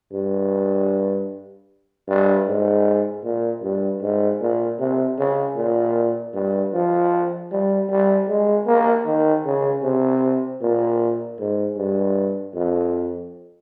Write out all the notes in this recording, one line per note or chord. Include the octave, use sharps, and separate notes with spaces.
G2
G2
G#2
A#2
G2
G#2
A#2
C3
C#3
A#2
G2
F3
G3
G3
G#3
A#3
D#3
C#3
C3
A#2
G#2
G2
F2